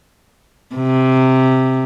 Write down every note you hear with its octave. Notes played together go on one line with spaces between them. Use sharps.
C3